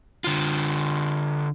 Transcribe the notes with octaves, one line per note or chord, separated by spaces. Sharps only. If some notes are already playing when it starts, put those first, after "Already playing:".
D3 F4